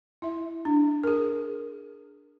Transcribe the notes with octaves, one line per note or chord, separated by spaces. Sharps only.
E4 E5
D4
G#4 A#4